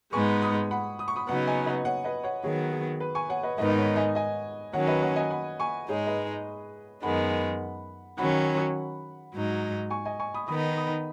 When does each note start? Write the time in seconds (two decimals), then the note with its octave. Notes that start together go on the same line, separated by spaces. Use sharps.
0.13 G#2 G#3 B3 D#4 G#5 C#6
0.42 B5 D#6
0.71 F#5 B5
0.99 D#6
1.08 C#6
1.16 B5 D#6
1.28 C#3 F#3 B3 D#4 F#5 B5
1.47 D#5 G#5
1.66 B4 D#5
1.85 C#5 F#5
2.04 B4 D#5
2.23 C#5 F#5
2.43 D#3 F#3 B3 G#4 C#5
2.71 G#4
3.00 B4
3.15 G#5 C#6
3.29 C#5 F#5
3.43 B4 D#5
3.58 G#2 D#3 B3 D#4 B4 D#5
3.69 D#5
3.77 C#5 F#5
3.96 D#5 G#5
4.15 D#5 G#5
4.73 D#3 F#3 C#4 C#5 F#5
4.87 B4 D#5
5.02 C#5 F#5
5.16 D#5 G#5
5.30 F#5 B5
5.60 G#5 C#6
5.88 G#2 G#3 D#4 G#4 C#5
6.07 B4 D#5
7.03 F#2 D#3 G#3 B3 F#5 B5
8.18 D#3 F#3 C#4 F#5 B5
9.34 G#2 F#3 D#4
9.90 G#5 C#6
10.05 D#5 G#5
10.19 G#5 C#6
10.34 B5 D#6
10.48 D#3 B3 D#4 B5 D#6
10.77 B5 D#6